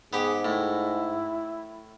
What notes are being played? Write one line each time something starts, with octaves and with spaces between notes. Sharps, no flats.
G#2 B3 G4 G#4
A2 E4